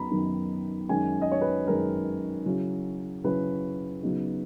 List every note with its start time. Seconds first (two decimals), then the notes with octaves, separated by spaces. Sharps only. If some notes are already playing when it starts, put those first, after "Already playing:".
Already playing: F#2 D#3 F#3 B3 A#5 B5
0.10 F#2 D#3 F#3 B3
0.89 F#2 D#3 G#3 C#4 G#5
1.22 D#5
1.32 C#5
1.41 B4
1.67 F#2 D#3 G#3 C#4 A#4
2.45 C#3 F#3 C#4 E4
3.24 C#3 F#3 C#4 E4 B4
4.02 C#3 F#3 B3 D#4